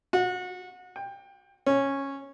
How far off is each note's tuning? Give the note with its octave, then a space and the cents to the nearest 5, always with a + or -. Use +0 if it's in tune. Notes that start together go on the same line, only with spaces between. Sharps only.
F#4 -30
G5 +20
C#4 -10